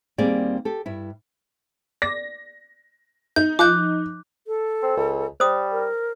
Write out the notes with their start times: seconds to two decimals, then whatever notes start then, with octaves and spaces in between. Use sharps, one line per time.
0.18 D#2 G3 A#3 C4 G#4 D5
0.65 G4 A4
0.86 G2 E4
2.02 D5 A#6
3.36 D#4 G6
3.59 F3 D6 F#6 G6
4.47 A4
4.82 C4
4.97 C#2
5.40 G3 C5 D#6
5.71 A#4